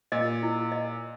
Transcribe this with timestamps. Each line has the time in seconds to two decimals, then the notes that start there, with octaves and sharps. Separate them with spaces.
0.12 A#2 D#5
0.43 E4
0.72 D#5